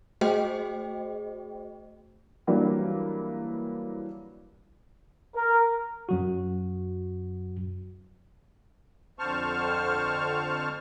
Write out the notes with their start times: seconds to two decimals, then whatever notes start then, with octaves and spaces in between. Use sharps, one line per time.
0.21 A3 F#4 G#4 C5 D#5 G5
2.47 E3 F#3 G3 A#3 D4
5.36 A#4
6.09 F#2 F#3 F#4
9.19 F2 D3 C5 A5 C#6 F6